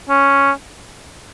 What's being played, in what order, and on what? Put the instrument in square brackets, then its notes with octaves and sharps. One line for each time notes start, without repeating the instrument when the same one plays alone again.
[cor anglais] C#4